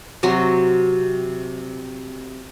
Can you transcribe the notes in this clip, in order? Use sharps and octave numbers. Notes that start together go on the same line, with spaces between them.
C3 F#3 F#4 C6